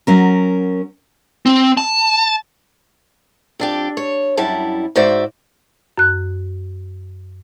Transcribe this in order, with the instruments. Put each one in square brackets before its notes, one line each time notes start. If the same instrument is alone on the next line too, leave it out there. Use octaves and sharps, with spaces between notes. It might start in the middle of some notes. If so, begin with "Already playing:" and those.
[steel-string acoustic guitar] F#3 C#4 A#4
[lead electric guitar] C4
A5
[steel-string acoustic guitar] F2 D4 G4
C#5
F#2 G3 E4 A5
G#2 F#4 C5 D5 E5
[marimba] F#2 F#6